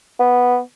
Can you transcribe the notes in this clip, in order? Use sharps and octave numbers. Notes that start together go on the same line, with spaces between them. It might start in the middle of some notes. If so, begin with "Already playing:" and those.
B3